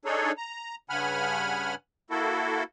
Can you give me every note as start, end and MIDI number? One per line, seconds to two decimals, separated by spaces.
0.05 0.32 62
0.05 0.32 63
0.05 0.32 68
0.05 0.32 69
0.05 0.32 73
0.38 0.76 82
0.90 1.75 43
0.90 1.75 49
0.90 1.75 78
0.90 1.75 80
0.90 1.75 83
0.90 1.75 89
2.10 2.63 58
2.10 2.63 64
2.10 2.63 66
2.10 2.63 69